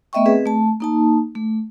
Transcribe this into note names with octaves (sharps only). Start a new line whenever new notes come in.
A3 B3 D#5 E5 G5 C#6
C4 G#4 B4 D#5
A3 A5
A#3 D#4 A5
A3